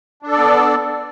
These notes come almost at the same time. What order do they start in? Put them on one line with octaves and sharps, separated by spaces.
D4 A4 D5 B3